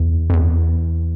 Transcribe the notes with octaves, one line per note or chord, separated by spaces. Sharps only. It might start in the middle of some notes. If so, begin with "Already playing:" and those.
Already playing: E2
F2
E2